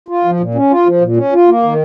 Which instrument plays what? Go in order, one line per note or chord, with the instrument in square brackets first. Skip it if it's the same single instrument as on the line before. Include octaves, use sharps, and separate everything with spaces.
[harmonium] F4
F3
A#2
C#4
F4
F3
A#2
C#4
F4
A#3
D#3